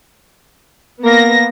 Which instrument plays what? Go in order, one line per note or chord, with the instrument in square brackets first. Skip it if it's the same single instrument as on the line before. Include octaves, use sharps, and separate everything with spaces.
[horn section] A#3 [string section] B3 A#6